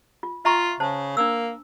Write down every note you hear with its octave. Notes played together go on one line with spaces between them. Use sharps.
F4
F4 E5 A#5 C#6
C#3 C5 A5
A#3 D4 E6